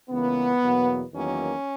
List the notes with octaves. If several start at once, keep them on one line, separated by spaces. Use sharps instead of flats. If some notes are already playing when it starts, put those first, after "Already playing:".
C#2 C#3 E3 A#3 B3
E2 B2 F#3 A#3
E2 D#3 F#3 A#3 C#4